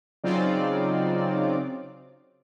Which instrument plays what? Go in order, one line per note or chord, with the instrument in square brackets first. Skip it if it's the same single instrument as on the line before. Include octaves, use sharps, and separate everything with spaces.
[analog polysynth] C#3 F#3 C4 D#4 F4 D5